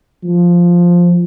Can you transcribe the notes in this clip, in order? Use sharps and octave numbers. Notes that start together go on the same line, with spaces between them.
F3